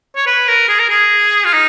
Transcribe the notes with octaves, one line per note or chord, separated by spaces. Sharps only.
C#5
B4
A#4
G#4
A#4
G#4
F4
D#4